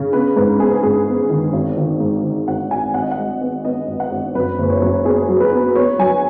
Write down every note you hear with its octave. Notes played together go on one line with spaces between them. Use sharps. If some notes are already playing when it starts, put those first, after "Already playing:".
Already playing: C#3
B3 B4
G#2 B4
B3 G#4
G#2 G#4
B3
D#3
G#1
D#3
G#2
D#3
G#1 F#5
G#1 G#5
G#1 F#5
D#5
F#5
G#3
B3
B3 D#5
G#1
F#5
G#1
F#2 B4
F#1
C#5
F#2
B3 G#4
F#3
B4
B3
B3 C#5
F#3 G#5